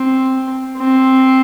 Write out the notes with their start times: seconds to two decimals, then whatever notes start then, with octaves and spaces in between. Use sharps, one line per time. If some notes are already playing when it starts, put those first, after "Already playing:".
Already playing: C4
0.77 C4